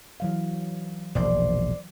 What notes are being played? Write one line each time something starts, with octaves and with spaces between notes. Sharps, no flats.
E3 F#3 F5
E1 A#1 C5 D5